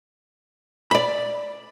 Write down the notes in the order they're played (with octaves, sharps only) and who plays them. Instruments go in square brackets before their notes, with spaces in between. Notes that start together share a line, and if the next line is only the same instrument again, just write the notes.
[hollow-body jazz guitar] D5 B5